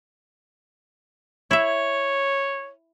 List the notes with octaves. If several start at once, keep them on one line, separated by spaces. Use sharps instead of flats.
E4 C#5 E5